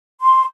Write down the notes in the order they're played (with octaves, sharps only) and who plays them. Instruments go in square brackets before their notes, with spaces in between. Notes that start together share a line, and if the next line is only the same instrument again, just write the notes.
[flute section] C6